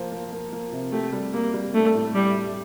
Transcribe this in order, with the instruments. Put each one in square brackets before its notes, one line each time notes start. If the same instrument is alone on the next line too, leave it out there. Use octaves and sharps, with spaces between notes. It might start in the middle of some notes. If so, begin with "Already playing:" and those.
Already playing: [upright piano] F3 A#3 F4
A#3
A#3
A#3
C3
[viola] A3 [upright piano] G4
[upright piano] G3
[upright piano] G3 [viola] A#3
[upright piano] G3
[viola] A3 [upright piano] D4
[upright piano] A2
[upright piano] A2 [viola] G3
[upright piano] G3